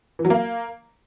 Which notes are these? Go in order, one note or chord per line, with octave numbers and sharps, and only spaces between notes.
E3
F#3
A#3